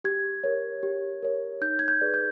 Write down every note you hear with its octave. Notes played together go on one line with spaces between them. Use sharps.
G4 G#6
A#4 C#5
G4
A#4 C#5
D#4 G6
G#6
G6
G#4 B4 D5
G6